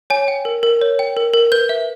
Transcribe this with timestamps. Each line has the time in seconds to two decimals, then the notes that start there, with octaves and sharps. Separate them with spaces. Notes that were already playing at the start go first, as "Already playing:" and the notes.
0.10 C#5 G#5
0.28 G5
0.45 A#4
0.63 A#4
0.81 C#5
0.99 G5
1.17 A#4
1.33 A#4
1.52 B4 G6
1.69 E5